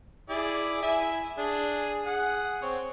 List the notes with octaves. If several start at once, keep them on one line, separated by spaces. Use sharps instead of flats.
E4 G#4 D5
E4 E5 G#5
D4 G#4
G#4 F#5
C4 C#5